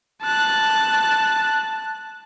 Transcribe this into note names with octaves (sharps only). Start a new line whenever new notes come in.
A5 F#6